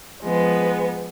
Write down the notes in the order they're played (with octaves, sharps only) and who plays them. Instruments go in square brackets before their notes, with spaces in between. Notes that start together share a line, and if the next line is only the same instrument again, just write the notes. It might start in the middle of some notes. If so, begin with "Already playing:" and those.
[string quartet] F3 G#3 B3